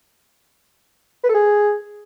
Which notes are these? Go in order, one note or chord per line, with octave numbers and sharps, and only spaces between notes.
B4
A4
G#4